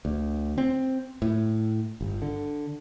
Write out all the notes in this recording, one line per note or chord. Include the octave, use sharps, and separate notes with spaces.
D2
C4
A2
G1
D3